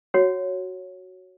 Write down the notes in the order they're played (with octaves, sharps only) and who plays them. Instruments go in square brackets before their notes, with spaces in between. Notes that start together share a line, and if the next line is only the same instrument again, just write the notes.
[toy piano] F#4 C#5 F#5